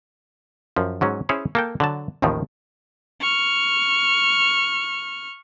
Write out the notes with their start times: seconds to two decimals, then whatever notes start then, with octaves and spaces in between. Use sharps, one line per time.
0.76 F#2 F3
1.01 G#2 F#3 C#4
1.29 C#4 E4 G#4 C5 C#5
1.55 A#3 A4 G5
1.80 D3 F#3 A5
2.22 A1 D#2 A2 D#3 F3
3.20 C#6 F6